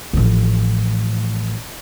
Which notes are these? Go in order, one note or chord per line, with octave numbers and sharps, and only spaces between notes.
A1 F3